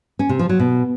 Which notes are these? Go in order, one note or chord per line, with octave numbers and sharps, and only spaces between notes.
C#4
C3
F3
F#3
B2